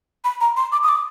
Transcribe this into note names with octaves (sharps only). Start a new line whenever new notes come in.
B5
A#5
C6
D6
D#6
D6